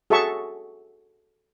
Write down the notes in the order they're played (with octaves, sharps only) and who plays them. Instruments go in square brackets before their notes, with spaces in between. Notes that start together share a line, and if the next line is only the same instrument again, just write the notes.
[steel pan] F#4 G#4 A4 E5 A5 C#6